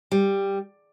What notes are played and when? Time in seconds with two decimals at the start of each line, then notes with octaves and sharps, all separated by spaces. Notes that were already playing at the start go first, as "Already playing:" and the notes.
0.12 G3